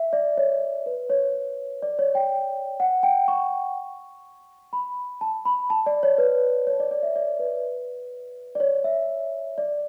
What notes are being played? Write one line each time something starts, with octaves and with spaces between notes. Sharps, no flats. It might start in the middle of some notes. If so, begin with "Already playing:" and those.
Already playing: E5
D5
C#5
B4
C#5
D5
C#5
G5
F#5
G5
C#6
B5
A5
B5
A5
D5
C#5
B4
C#5
D5
D5
E5
D5
B4
D5
C#5
E5
D5